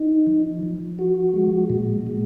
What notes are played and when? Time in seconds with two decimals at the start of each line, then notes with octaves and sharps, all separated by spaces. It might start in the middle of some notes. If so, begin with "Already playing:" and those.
Already playing: D#4
0.27 F3
0.63 F3
0.99 F#4
1.34 G#3
1.70 A#2
2.07 G#3